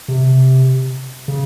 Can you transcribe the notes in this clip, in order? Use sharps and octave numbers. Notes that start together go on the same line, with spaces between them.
C3
C#3